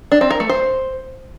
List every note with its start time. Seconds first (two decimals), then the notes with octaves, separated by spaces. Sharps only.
0.12 D4
0.21 C4
0.31 A#4
0.40 A3
0.49 C5